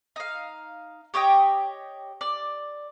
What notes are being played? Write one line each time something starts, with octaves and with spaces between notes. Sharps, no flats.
D#4 F5
G4 C#5 D#5 G5
D5